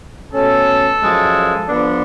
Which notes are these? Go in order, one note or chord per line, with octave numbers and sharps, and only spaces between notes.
B2 A3 C#4 A4
F#2 F3 G#3
D3 F3 B3 D4